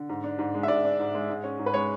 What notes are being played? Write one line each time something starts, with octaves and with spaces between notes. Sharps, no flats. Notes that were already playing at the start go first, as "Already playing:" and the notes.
Already playing: D3
G#2
D4
G#2
G#3
E5
G#2 D5
D4
G#2
G#3
G#2
C#4
G#2
B4
G#3 C#5